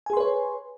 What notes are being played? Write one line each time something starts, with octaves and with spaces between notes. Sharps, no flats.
G#4 B4 C#5 G#5 C6